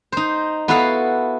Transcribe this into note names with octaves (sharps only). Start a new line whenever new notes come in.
D#4 C5
B3 E4 F#4 A4 F5